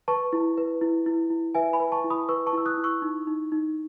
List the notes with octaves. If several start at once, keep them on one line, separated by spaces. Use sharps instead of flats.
B4 A5 C#6
E4
B4
E4
E4
E4
B4 E5 G#5
G#5 B5
B4
A5 C#6
E4
B5 D#6
B4 C#6 E6
A5 C#6
E4 E6
D#6 F#6
E4
C#6 E6
D#4
D#4
D#4